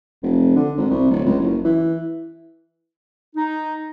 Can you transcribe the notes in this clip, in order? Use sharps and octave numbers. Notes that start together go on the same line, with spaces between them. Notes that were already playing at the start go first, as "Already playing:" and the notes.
F1
D3
G#1
C2
D1
C#2
F#1
E3
D#4